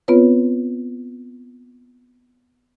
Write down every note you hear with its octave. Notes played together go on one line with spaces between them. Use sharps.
B3 C4 F4 B4 C#5